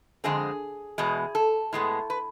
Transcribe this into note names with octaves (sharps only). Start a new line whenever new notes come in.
F2 D3 G#3 C4 G#4
E2 B2 G#3
A4
A2 G#3 B3
B4